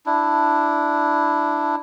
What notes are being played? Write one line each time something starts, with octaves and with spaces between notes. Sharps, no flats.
D4 E4